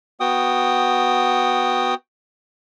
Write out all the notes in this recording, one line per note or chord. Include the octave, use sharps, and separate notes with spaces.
B3 F#4 G5 D#6